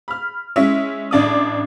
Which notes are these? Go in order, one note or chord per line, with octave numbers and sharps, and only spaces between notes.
B5 F6
G#3 C#4 E4 E5
A1 D4 D5 D#5 D#6